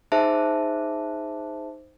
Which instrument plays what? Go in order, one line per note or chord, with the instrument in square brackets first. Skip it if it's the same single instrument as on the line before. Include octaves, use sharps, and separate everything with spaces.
[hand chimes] D#4 G#4 C5 E5 A5